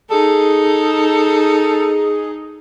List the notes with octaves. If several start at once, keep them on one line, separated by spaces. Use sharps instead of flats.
D#4 G#4 A4